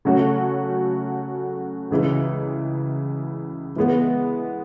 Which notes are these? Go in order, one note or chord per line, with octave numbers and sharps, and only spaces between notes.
C#3 F#3 A3 C#4 F#4
C#2 C#3 E3 G#3
E3 G#3 B3